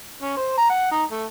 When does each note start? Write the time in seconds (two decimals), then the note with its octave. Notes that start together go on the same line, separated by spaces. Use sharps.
0.22 C#4
0.37 C5
0.57 A#5
0.69 F#5
0.91 D#4
1.10 A3